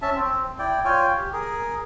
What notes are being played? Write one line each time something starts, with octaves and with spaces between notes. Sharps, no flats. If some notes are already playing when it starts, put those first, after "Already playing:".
C#4 E5 A5
C4
E4 D5 G5
F4 C#5 G5 G#5
G4
G#4 A#4